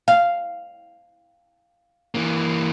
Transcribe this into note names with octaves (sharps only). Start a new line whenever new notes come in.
F5
E3 A#3